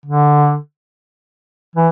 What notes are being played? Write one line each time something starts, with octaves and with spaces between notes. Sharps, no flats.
D3
E3